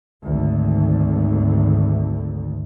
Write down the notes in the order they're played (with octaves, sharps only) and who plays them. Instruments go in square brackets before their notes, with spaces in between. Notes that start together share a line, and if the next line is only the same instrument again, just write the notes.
[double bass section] G#1 D2